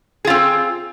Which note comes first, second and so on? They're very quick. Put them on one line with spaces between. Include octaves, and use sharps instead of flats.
G#4 F4 C4